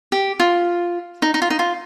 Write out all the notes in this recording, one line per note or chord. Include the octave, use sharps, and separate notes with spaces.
G4
F4
D#4
D#4
F4
D#4
F4